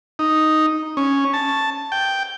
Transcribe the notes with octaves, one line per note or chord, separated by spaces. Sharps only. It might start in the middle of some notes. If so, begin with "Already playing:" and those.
D#4
C#4
A5
G5